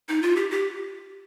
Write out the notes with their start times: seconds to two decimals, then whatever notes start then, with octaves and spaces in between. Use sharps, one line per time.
0.09 D#4
0.22 F4
0.36 G4
0.50 G4